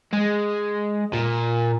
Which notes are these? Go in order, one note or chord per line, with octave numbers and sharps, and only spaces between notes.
G#3
A#2